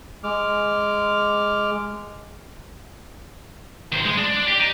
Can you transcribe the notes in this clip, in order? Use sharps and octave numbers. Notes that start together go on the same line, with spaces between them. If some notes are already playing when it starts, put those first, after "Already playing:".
G#3 D6 F6
D#3 C5
G#3
D4
G4
D#4